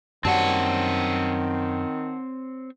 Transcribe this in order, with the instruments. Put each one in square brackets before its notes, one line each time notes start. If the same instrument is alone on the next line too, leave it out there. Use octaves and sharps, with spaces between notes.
[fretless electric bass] F#2 F#3 G3 [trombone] D#3 [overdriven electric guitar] C4 C#5 [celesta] F#5 A5